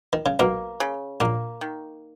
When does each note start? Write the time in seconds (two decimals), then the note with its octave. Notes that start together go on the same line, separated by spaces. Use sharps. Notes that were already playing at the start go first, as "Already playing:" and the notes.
0.13 D#3
0.26 C#3
0.39 B1 B2 A#3
0.80 C#3
1.20 A#1 A#2 A#3
1.61 D#3